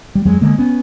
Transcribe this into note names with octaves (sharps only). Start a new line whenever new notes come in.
G3
F2 F#3 G#3
D3 G#3 A#3
B3 C#4